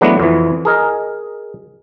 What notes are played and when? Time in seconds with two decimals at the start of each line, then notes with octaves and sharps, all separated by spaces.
0.01 E3 F#3 G#3 A3 B3 D4
0.20 F2 E3
0.65 G#4 A#4 D#5